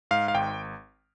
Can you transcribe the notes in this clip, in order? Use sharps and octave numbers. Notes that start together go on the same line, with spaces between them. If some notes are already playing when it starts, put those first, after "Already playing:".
G#2 F5
F5
G#1 G5